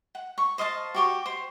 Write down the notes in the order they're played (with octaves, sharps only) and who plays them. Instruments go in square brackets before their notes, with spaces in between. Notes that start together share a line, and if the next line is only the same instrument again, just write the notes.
[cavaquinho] F#5
C#6
C5 D#5 F5 A5
F#4 G4 C#6
C5